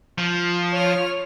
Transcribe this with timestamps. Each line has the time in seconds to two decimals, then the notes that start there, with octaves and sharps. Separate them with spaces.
0.18 F3
0.71 C#5 F6